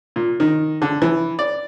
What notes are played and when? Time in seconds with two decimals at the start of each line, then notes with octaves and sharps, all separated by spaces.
0.16 A#2
0.40 D#3
0.82 D3
1.02 E3
1.39 D5